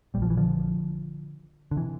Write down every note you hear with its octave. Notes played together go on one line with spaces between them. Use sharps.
A#1 A#2 G3
F3
E3
D3 F3
D3
C3 E3